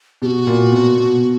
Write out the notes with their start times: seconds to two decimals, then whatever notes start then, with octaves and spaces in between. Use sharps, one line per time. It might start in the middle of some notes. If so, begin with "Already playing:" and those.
0.22 B2 G4
0.26 F#4
0.47 A#2
0.72 B2
0.97 B2